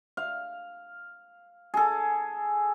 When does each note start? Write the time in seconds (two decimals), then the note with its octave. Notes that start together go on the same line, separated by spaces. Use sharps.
0.17 F5
1.74 G#4 A4